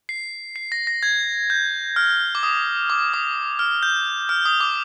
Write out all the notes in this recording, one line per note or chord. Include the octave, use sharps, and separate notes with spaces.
C7
C7
A#6
A#6
G#6
G6
F6
D6
D#6
D6
D#6
F6
G6
F6
D#6
D6